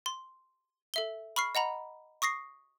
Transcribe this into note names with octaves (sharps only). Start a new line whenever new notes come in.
C6
A4 E5 G7
B5 C#6 F6 C7
D#5 F#5 A#5 B5
C#6 D#6 A#6 C7